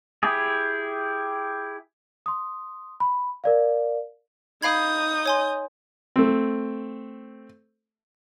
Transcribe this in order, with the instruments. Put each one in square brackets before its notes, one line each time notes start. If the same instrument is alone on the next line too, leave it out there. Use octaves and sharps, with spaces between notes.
[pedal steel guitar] E4 G4 G#4
[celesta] C6 D#6
B5
A#4 D5 F5
[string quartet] D#4 D#6 G6 [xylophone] F5 B5 G#6
[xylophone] C#5 G#5 C6
[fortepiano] A3 C4